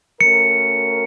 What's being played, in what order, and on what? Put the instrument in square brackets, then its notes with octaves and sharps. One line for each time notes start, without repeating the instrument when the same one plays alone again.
[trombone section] A3 C#4 F#4 A#4 [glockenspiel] C#7